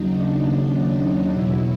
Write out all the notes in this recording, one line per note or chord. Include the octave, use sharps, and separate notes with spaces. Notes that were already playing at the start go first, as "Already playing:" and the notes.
Already playing: D#2 C#3 F#3 D#4
D4
D#4
E2 B2 F#3 E4